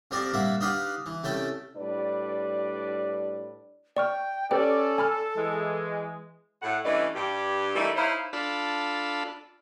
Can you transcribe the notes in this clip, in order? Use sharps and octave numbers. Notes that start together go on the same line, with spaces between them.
F2 F3 C4 G4 A#4 D5
G2 A#2 G3 A#3 E5 F#5
D4 D#4 G4 B4 F5 F#5
E3
C2 A3 C#4 E4 G5 A5
A2 G3 D4 B4 D5
D5 G5 C#6 F6
C#4 G4 A4 B4 D5 G5
G#5 B5 F6
E3 G#3
A2 F#5
G2 E3 A3 C#4 D5 D#5
G2 G4
E3 G3 A3 A#3 D#4
D#4 E4 C5 C#5 E5 F5
D4 F4 A4 B5